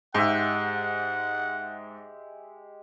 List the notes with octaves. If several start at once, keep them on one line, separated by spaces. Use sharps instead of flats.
G#2 G#3 G4 E5 F#5